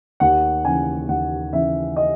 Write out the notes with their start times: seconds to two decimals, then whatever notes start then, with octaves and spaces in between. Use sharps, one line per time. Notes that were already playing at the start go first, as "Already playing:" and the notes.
0.20 D#2 F#5
0.65 C#3 E3 G#5
1.09 D#2 F#5
1.53 C#3 E3 E5
1.96 D#5